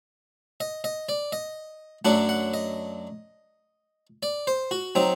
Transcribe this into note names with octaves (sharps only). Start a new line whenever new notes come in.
D#5
D#5
D5
D#5
F#2 F#3 A3 D4 F#5
F#5
D#5
D5
C5
F#4
F#3 C4 D#4